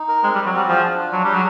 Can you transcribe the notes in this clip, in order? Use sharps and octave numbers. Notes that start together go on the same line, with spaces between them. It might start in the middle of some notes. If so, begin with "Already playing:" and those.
Already playing: D#4
A#4
G#3 C4
G3
C4
F#3
G3 F#4
F3 G#4
D4
F4
F#3 D4
G3 G#4
F#3